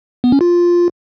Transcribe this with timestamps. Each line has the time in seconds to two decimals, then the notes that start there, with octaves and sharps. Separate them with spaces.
0.24 B3
0.32 C#4
0.41 F4